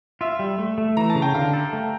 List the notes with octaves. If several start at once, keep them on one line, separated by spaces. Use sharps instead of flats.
F4 E5
G3
A3
A3
E3 A#5
A5
C#3
G5
D3 F5
A4
A3